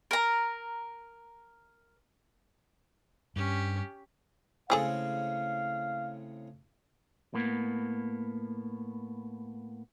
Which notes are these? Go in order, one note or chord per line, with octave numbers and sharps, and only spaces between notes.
A#4 A#5
G2 C#4 G4
A2 C#3 G#3 C4 G#4 A4 F5
A2 A#3 B3